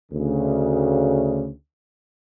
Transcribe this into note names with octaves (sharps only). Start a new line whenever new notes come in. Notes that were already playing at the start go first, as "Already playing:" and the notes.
D2 C#3